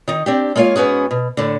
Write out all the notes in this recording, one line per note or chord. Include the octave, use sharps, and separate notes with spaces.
D#3 D#4
C4 D4 G4
G#3 A#3 F4 C#5 F5
G#2 B3 C#4 F#4 G#4
B2
A2 D3